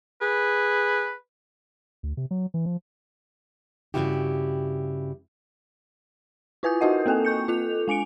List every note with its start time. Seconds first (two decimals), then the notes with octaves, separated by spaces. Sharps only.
0.21 G#4 B4
2.03 D2
2.17 C3
2.31 F#3
2.54 E3
2.65 F3
3.94 G2 A#2 C#3 E4 F#4 G4
6.63 E4 F4 B4 G#5 D#6 G6
6.81 D#4 F#4 A#4 D#5 F#5
7.06 A#3 C4 A4 G5 G#5
7.25 C#6 G6 C#7
7.48 F4 A4 F7
7.88 G#3 G#5 C#7 D7